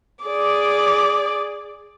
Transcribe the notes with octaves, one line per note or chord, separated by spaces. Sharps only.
G#4 D5 D6